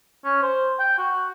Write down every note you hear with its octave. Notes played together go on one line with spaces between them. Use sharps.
C#4
C5
G5
F#4